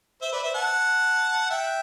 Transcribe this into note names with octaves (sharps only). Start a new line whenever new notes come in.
C5 E5
B4 D5
C5 E5
F#5 A5
E5 G5